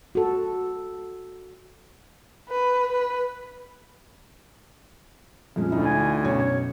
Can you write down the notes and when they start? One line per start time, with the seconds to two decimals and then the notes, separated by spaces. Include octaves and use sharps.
0.15 F#4 A4
2.49 B4
2.92 B4
5.56 F2 A#2 G#3 C#4
5.70 D2 D3 D#4 E4
5.85 G#5
6.23 F#2 B2 C#5 G#6